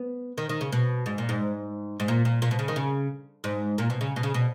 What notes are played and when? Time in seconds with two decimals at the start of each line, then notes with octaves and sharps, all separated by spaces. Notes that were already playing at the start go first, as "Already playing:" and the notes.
Already playing: B3
0.38 D#3
0.49 D#3
0.61 C#3
0.72 B2
1.06 G#2
1.18 A#2
1.29 G#2
2.00 G#2
2.08 A#2
2.25 A#2
2.42 A#2
2.51 B2
2.59 C#3
2.68 D#3
2.76 C#3
3.44 G#2
3.78 A#2
3.90 B2
4.01 C#3
4.16 B2
4.23 C#3
4.34 B2